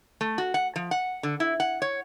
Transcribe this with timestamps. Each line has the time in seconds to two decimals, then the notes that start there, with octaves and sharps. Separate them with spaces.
0.21 A3
0.38 F#4
0.54 F#5
0.76 F3
0.91 F#5
1.23 D3
1.40 E4
1.60 F#5
1.82 C#5